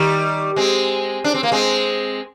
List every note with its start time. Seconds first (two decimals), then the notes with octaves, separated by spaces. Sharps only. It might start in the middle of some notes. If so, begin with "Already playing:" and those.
Already playing: D#3 G3
0.56 G#3 C4
1.24 D4
1.34 C4
1.43 A#3
1.52 G#3 C4